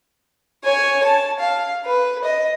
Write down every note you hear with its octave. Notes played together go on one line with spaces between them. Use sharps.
C#5 G#5
A5
F5
B4
D#5